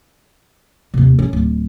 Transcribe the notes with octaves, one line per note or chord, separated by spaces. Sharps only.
D#2 C3
C#4
D1